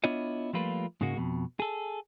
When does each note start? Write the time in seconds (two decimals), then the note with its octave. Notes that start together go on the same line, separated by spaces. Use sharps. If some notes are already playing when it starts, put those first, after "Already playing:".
0.04 B3 D4 E4 F4 C#5 D#5
0.53 F3 G3 A3 A#3 F4 B4
1.01 G#2 C#3 G#3 A#3 F#4
1.17 F2 B2
1.60 G#4 A4